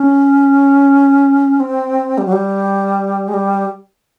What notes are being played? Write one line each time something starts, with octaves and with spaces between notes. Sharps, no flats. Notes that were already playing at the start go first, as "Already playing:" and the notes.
Already playing: C#4
C4
G3
F#3
G3
G#3
G3